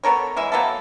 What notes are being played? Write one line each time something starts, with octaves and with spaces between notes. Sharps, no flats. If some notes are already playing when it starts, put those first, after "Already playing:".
B3 A4 A#4 C#5
E3 G#3 E5
F#3 A#3 B3 A4